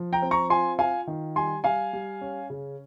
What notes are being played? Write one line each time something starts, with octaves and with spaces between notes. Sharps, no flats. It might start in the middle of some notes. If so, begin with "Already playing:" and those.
Already playing: F3
G5 A#5
C4
A#5 C#6
F4 G#5 C6
F4 F5 G#5
D#3
G3 G#5 C6
G3 F5 G#5
G3
C#4
C#3